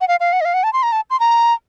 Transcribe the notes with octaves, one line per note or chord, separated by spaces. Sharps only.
F#5
F5
F5
F#5
D#5
F5
F#5
A5
C6
A#5
A5
C6
A#5